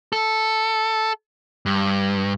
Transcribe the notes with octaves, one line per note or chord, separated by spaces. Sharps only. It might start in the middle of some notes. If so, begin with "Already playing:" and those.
A4
G2